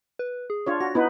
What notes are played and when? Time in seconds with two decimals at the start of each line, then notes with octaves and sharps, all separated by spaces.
0.19 B4
0.50 G#4
0.67 D4 F4 C#5
0.80 F#4 A#6
0.95 B3 D#4 E4 B4